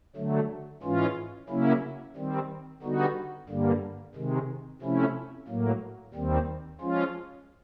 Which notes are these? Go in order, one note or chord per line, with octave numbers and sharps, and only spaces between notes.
D3 F#3 A3
G#2 E3 G#3 C#4 F4
C#3 F#3 A#3 C#4 E4
D#3 G3 C4
D3 G3 B3 D#4 F#4
G2 D3 G3 A#3
C3 D#3 G#3
C3 F3 A3 C#4 E4
A2 F#3 A#3
D#2 D#3 G3 C4
F3 G#3 C#4 F4